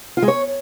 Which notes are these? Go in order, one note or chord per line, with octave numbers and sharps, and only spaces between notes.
F4
G#3
C#5